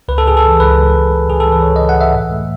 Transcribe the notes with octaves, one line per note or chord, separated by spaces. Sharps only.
C#2 B4
A4
C#2 G#4
A4
E3
C#2 B4
C#2
C#2
C#2
C#2 G#4
A4
E3
B4
C#2 C#5
C#3 D#5
F#5
E3 E5
A2 E5
A3